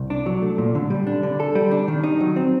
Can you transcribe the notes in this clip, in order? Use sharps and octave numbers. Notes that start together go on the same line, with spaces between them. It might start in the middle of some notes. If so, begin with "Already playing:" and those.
Already playing: C2
D4
F#3
A3
A#2
D3
G3
D4
D3
A4
G3
D4
D#3
D#4
F#3
C4